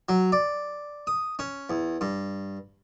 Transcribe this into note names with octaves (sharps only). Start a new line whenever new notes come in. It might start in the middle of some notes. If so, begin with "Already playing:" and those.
F#3
D5
D#6
C#4
E2
G2